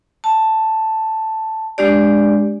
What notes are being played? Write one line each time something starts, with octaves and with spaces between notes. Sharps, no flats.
A5
G#3 D4 G4 D5